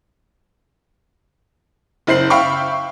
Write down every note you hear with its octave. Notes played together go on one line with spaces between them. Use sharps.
F#1 E4 C5 C7 F#7
E5 F5 G5 B5 C#6